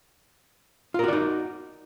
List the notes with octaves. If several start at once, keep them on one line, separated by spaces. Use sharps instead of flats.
D#4 F4 F#4 A#4 D5